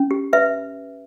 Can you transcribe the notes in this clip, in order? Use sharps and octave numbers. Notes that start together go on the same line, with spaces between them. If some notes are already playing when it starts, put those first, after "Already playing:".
Already playing: C#4
G4
B4 E5